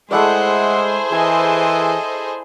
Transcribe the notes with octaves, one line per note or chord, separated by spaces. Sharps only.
G#3 A3 E4 G#4 C5 D5 F#5
E3 A4 D#5 G#5